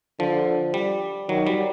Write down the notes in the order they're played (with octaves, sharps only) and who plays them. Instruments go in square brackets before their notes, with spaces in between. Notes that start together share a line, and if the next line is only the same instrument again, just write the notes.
[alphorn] D3 [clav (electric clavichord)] F3
[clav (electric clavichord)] G3
[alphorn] D#3 [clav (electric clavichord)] F#3
[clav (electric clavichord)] G3